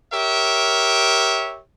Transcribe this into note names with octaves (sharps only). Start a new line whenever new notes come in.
G4 A#4 C#5 E5